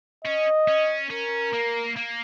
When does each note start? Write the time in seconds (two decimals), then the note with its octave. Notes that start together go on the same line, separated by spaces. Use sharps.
0.25 C#4 D#5
0.68 C#4
1.10 C#4 A#4
1.54 A#3
1.97 A#3